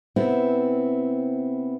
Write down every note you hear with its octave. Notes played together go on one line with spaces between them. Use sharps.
C3 B3 C4 E4